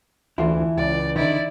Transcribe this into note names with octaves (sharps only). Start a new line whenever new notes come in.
D2 E3 E4 F4 A4
C#2 D5
D3 D#3 E4 D5